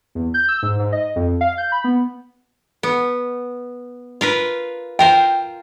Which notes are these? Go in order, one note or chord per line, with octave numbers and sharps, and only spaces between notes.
E2
G6
E6
G#2
G#2
D#5
F2
F5
G6
B5
B3
B3
F4 A#4 B4
F4 A#4 C5 G5